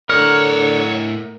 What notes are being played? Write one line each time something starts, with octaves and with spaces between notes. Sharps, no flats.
A2 D3 A#4 C#5 F#5 F6